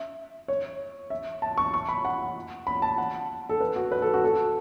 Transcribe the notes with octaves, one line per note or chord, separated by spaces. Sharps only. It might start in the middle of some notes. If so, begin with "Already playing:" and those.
Already playing: E5
C#5
E5
A5
C#6
C#6
B5
F#5
B5
A5
F#5
A4
B4
F#4
B4
A4
F#4
A4